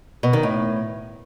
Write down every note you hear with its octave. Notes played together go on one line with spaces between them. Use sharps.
B2
D#3
A2